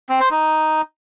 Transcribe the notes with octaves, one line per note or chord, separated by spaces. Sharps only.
C4
C5
D#4